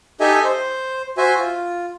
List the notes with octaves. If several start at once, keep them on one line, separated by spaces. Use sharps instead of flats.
D#4 G4 A4 D#5 E5 G#5
C5
F#4 C5 E5 G#5
F4